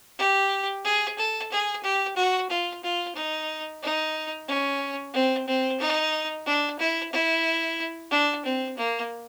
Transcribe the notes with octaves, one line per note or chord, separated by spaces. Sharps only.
G4
G#4
A4
G#4
G4
F#4
F4
F4
D#4
D#4
C#4
C4
C4
D#4
D4
E4
E4
D4
C4
A#3